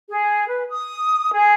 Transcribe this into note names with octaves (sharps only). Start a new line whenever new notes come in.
G#4
B4
D#6
G#4